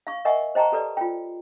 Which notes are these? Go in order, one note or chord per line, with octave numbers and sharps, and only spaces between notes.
F5 C#6
A#4 D#5 E5 F#5 G#5 C#6
C5 D#5 G5 A5 A#5 C#6
G4 A4 B4 D5
F4 G5